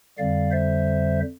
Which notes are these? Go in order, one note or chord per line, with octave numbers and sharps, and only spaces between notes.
F2 D3 G3 D5 F5
C5 E5